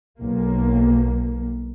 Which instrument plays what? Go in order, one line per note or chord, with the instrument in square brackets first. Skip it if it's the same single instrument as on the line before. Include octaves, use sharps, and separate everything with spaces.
[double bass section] B1 A#3